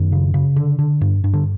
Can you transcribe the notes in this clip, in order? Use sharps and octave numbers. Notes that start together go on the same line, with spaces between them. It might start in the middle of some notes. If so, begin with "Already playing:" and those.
Already playing: F#2 D#3
C#3
C#3
D3
D3
G2
G2
D3